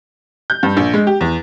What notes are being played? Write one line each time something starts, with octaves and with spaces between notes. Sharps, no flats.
G6
G2
A#1
G#3
G4
E2